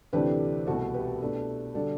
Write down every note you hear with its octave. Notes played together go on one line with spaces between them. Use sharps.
D2 C3 E3 A3 D4 G4 B4
C2 B2 A3 F#4 A4
G4 B4
B2 A3 D4
D3 G3 D4 F#4 A4